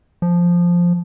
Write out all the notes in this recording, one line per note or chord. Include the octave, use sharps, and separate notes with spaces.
F3